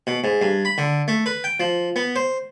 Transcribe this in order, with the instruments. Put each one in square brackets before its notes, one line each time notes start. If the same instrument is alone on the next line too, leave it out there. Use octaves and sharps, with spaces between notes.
[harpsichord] B2
G#2
G2
B5
D3
A3
B4
G5
F3
B3
C5